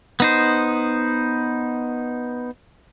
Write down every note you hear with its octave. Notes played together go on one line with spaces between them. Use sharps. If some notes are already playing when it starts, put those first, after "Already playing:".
B3 D#4 C5